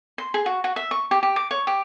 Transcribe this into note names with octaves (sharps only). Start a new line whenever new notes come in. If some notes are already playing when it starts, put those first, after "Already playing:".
C6
G#4
F#4
F#4
E5
C#6
G4
G4
D6
C#5
G4